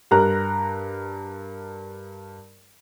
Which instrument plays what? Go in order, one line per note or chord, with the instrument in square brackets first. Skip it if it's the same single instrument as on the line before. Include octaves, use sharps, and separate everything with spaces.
[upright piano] G2 A#4 A#5 F#6